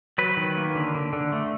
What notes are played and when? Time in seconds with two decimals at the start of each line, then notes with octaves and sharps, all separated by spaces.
0.18 F#3 B4
0.37 D#3
0.57 A#3
0.75 D3
0.95 D3
1.13 D3
1.32 A3